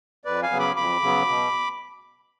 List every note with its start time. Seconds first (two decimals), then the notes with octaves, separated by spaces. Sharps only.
0.25 F2 B4 D5
0.42 F5 G#5
0.51 C#3 F#3 B3
0.59 B5 D6
0.76 F2 B5 D6
1.02 C#3 F#3 B3
1.28 B2